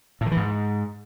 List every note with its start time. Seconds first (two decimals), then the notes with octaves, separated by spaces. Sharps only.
0.21 A2
0.26 D#3
0.32 E3
0.37 G#2